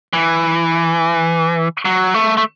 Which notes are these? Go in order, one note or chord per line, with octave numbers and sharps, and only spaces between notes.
E3
F#3
A3
A3